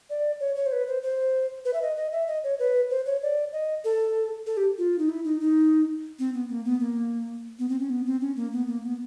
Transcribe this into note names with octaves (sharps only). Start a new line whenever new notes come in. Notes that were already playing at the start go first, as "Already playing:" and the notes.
D5
C#5
C#5
C5
B4
C5
C5
B4
E5
D#5
D#5
E5
D#5
C#5
B4
C5
C#5
D5
D#5
A4
A4
G4
F4
D#4
E4
D#4
D#4
C4
B3
A#3
B3
A#3
B3
C4
C#4
B3
C4
C#4
A#3
B3
A#3
B3